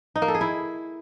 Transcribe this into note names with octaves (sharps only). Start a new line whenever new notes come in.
D#4
A#3
A4
G#4
E4